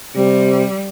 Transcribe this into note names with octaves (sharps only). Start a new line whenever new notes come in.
C3 G3